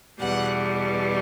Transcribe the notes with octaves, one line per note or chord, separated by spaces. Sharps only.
E2 B2 G3 F#5